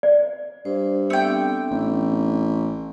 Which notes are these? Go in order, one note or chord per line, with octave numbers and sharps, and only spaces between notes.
D5
G2 C5
A3 B3 C4 D4 G5
A1